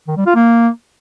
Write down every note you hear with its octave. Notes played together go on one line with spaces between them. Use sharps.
D#3
G3
F4
A#3